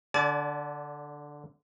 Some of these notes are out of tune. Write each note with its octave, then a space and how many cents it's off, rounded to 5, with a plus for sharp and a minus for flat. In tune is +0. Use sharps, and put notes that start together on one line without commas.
D3 +0 D5 -25 G#5 +45